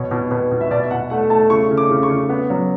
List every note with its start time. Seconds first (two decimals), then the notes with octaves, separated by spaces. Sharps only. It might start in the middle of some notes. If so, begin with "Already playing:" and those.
Already playing: B2 C#5
0.11 B2
0.31 B2 B4
0.51 B2
0.61 E5
0.71 B2 D5
0.83 E5
0.91 B2 F#5
1.10 A3 F#5
1.30 A3 A5
1.50 C#3 C#6
1.71 C#3
1.78 D6
1.91 C#3
2.03 C#6
2.09 C#3
2.29 B3
2.50 F#3